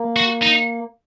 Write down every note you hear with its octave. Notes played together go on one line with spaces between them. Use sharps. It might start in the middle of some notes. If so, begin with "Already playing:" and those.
Already playing: A#3
F#4
D#4